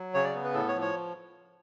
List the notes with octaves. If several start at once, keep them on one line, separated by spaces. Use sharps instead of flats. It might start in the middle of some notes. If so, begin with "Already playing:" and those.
Already playing: F#3
C#3 C#5
D5
B3
B4
A2 A4
C#5
F3
C#5